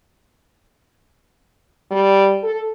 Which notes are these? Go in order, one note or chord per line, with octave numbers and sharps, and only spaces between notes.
G3
A4